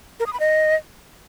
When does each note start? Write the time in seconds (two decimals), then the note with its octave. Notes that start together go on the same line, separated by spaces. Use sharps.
0.20 A#4
0.26 D#6
0.33 B5
0.40 D#5